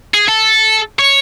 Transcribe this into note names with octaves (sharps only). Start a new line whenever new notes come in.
G#4
A4
C#5